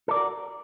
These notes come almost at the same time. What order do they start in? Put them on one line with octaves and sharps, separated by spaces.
A4 D5 A#4 F#4